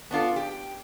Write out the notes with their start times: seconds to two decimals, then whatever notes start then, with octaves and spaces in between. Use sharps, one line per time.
0.11 B3 D4 F4 A4
0.36 G4